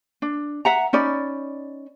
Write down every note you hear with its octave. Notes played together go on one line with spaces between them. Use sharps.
D4
E5 F#5 A#5
C#4 D#4 D5 B5